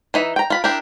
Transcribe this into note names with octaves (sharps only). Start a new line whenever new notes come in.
E3 D#4 E5
G5 A#5
F4 B5
D4 E4 G4 A#4